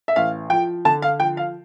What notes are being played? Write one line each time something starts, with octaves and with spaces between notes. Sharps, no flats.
E5
A1 F5
F3 G5
D3 A5
F5
F3 G5
F5